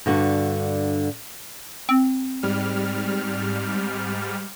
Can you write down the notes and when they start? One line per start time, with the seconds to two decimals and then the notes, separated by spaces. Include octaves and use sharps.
0.06 G2 D3 F#4
1.89 C4
2.43 G#2 G3 F6